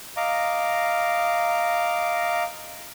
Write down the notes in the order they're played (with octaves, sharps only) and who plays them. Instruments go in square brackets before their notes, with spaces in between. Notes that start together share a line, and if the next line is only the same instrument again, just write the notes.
[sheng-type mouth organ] D#5 F5 A#5 D6